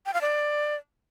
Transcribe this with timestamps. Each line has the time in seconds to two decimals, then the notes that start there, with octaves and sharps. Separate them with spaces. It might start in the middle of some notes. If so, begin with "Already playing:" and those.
0.06 G5
0.14 F5
0.21 D5